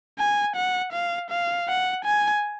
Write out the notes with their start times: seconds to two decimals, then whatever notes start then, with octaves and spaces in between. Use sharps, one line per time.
0.19 G#5
0.56 F#5
0.93 F5
1.30 F5
1.68 F#5
2.05 G#5